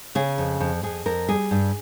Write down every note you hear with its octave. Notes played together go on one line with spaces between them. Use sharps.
C#3 G#4
F2
F2
F2 G#4
F2 A#4
G3 G#4
G2